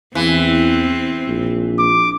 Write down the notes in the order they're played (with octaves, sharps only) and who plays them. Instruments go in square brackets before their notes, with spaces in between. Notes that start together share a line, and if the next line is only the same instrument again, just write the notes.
[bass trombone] E2 [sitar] E3 [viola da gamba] C4
[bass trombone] A#1
[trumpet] D6